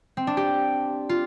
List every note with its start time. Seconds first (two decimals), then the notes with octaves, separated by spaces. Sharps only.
0.17 C4
0.27 D4
0.37 G4
1.09 F4